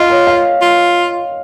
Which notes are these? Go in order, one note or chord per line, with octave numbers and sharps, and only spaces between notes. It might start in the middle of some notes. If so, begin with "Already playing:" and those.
Already playing: F4 D#5
C#5
F5
F4